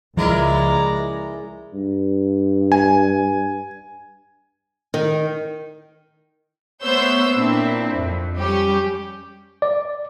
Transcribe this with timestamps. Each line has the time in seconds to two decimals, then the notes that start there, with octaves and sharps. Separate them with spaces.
0.17 C#2 F3 G#3 E4 A#4 D5 A#5
1.73 G2
2.72 G#5
4.94 D#3
6.83 A3 B3 C5 C#5 E6 G6
7.34 A#2 C4 D4 E4
7.95 F2
8.35 G3 C#4 G4
9.62 D5